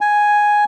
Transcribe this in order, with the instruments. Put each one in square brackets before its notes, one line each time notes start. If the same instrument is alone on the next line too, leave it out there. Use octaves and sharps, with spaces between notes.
[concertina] G#5